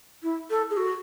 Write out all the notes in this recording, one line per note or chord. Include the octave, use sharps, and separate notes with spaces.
E4
A4
G#4
F#4